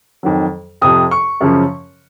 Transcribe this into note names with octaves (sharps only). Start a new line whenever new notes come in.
F2 D#3 F#3
F2 C3 F3 D#6
C#6
F#2 C#3 F3